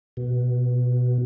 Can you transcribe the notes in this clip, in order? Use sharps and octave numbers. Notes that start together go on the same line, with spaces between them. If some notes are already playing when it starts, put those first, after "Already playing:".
B2